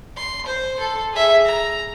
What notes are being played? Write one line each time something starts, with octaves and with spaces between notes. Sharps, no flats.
C6
C5
A4 C6
G#4 E5
A#5